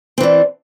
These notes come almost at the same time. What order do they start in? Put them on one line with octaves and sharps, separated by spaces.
C4 E3 D4